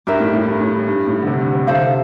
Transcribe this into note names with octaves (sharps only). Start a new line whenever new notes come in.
G2 G4 A#4 E5
A2
A2
G2
A2
G2
G2
A2
D3
C3
D3
C3
D3 E4 A4 C5 F5
C3